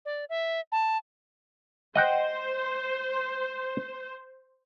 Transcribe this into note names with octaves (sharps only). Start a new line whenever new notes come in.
D5
E5
A5
C5 D#5 F#5 G5